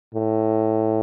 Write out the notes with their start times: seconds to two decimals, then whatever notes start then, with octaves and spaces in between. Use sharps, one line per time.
0.14 A2